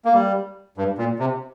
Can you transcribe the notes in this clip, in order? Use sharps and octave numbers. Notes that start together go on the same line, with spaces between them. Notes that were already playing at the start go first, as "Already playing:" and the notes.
A#3
G3
G2
A#2
C3